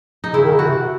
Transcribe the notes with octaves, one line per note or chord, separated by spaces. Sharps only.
D#4
C#3 E4
D#3
C#3
F#4
C3